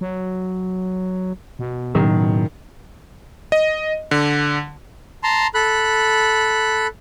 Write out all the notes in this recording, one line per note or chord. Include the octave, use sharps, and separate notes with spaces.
F#3
B2
F#1 A2 D#3 F#3
D#5
D3
A5 A#5 C6
A4 B5 F#6